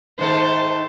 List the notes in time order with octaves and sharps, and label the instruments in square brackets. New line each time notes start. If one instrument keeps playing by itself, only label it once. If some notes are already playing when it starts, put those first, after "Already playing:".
[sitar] G#2 D#3 A3 [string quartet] C5 A5